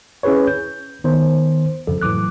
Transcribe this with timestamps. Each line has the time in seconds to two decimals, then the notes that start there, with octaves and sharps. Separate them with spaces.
0.23 C#4 E4 G#4 B4 C#5
0.47 G6
1.04 D#3 B3 C5
1.87 F2 C#3 F3 A4
2.02 A2 E3 F#3 D6 F#6